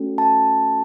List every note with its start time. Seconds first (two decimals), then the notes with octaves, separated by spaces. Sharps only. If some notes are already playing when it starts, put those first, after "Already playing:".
Already playing: A3 C#4 F#4 A4
0.18 A5